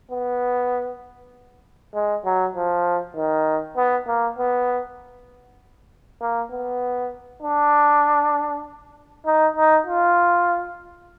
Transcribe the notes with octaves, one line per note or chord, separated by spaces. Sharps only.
B3
G#3
F#3
F3
D#3
B3
A#3
B3
A#3
B3
D4
D#4
D#4
F4